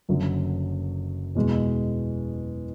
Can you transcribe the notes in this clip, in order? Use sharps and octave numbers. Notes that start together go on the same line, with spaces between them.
F#1 F#2 D3 F#3
E2 B2 G#3